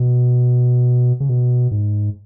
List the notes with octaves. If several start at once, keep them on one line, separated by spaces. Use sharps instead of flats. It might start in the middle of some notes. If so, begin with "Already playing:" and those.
Already playing: B2
C#3
B2
G#2